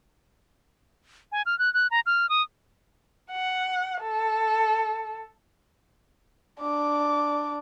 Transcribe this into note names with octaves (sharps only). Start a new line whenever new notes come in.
G#5
F6
F#6
F#6
A#5
F6
D#6
F#5
A4
D4 D6